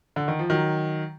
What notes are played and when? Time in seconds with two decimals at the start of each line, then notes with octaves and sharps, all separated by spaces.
0.16 D3
0.28 D#3
0.39 F3
0.50 D#3 F#3